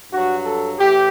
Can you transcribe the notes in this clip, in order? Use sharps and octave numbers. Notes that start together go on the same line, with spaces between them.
G2 F#3 F#4
A4
A2 E3 G4